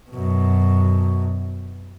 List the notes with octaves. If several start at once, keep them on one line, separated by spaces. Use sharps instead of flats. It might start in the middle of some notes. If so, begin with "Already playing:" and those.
F#2 B2